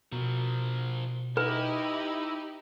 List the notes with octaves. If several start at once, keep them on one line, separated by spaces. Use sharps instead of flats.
B2 F3 A#4
D#4 E4 G4 B4